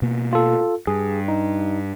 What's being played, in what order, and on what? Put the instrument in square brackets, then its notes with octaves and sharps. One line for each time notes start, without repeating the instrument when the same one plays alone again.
[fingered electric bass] B2 A#3
[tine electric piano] F4 A4
[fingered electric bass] G2 [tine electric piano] G#4
[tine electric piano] D#4